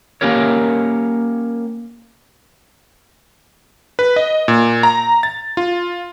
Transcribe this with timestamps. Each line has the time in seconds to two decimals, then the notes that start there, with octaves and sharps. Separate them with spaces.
0.21 A#3 C4 C#4 G4 A#4 C#5
3.99 B4
4.16 D#5
4.48 A#2
4.83 A#5
5.23 A6
5.57 F4